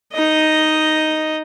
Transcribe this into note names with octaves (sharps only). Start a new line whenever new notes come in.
D#4 D#5